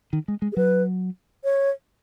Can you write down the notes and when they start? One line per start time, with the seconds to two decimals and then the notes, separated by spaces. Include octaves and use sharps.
0.13 D#3
0.28 G#3
0.42 G#3
0.52 G#4
0.56 F#3 B4
1.44 C#5